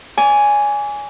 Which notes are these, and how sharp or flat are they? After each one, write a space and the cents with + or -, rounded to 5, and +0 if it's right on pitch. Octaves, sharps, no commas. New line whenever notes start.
D5 -35 G#5 +0